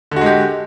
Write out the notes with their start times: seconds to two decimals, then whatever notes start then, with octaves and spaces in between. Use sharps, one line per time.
0.11 D3
0.16 F#4
0.21 G#3
0.26 G4